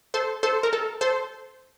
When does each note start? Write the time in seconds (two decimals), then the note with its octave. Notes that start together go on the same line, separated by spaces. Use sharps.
0.14 A4 C5
0.43 A4 C5
0.63 A#4
0.73 A4
1.01 A4 C5